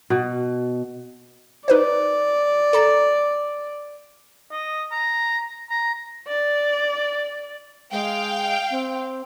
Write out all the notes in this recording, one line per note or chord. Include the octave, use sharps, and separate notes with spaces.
B2
D#4 B4 C5 D5
A4 A#5 A6
D#5
A#5
A#5
D5
G#3 F5 G5
C4